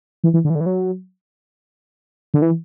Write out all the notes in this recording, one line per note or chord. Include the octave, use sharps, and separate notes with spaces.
E3
E3
D3
E3
D3
E3
F#3
D3
E3